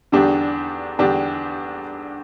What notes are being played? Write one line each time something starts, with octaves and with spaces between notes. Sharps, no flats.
E2 D3 G3 D4 G4
E2 D3 G3 D4 G4